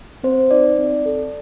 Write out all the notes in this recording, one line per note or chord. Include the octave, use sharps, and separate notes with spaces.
C4 C5
D#4 D5
C4
A4